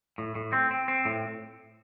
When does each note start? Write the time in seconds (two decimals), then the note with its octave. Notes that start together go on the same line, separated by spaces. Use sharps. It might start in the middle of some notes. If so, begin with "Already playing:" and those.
0.18 A2
0.35 A2
0.53 C4
0.71 C4
0.88 C4
1.05 A2